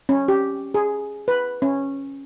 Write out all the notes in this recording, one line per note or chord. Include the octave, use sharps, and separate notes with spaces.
C#4
G4
G#4
B4
C#4